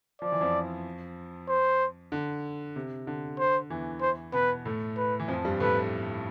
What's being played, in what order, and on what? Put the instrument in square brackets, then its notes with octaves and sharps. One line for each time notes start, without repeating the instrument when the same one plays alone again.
[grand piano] F3 [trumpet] D5
[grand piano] E3
F2 F3
[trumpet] C5
[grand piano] D3
C3
D3
[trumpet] C5
[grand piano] E2 E3
[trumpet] C5
[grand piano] B2 B3 [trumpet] B4
[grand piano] A2 A3
[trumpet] B4
[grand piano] E3
F2 F3
G2 G3
[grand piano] A2 A3 [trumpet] B4